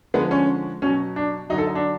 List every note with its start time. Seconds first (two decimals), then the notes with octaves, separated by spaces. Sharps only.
0.14 D3 F3 G#3 B3
0.31 C#4
0.82 B2 F#3 C#4
1.16 D4
1.50 F#3 D#4
1.53 D3
1.58 A4
1.67 D#4
1.75 D4